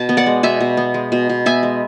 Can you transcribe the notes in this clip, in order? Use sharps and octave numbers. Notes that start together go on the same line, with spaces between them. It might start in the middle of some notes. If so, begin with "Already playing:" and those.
Already playing: B2 A5
B3
D5 F#5
G#3
B2 E5 G#5
B2
B3
G#3
B2
B2
B3 E5 G#5
G#3